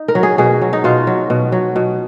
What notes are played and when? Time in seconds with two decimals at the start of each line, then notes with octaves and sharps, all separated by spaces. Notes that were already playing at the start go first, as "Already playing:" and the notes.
Already playing: D#4
0.08 A#4
0.15 F#3
0.23 G#4
0.38 B2 G#4
0.61 F#3
0.73 D#4
0.84 B2 F4
1.07 F#3
1.30 B2
1.52 F#3
1.76 B2